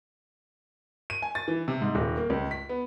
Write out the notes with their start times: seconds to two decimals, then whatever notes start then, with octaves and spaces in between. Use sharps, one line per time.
1.10 D#7
1.22 G#5
1.35 A6
1.48 E3
1.68 C3
1.82 G#2
1.95 D#1
2.17 A#3
2.30 C#2
2.51 B6
2.69 B3